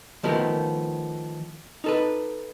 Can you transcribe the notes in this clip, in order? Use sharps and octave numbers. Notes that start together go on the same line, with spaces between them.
D#3 F3 A3 B3 G4 A#4
D#4 A4 B4